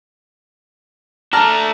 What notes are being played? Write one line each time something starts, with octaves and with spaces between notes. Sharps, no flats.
A3 D4 A5 A#5 F6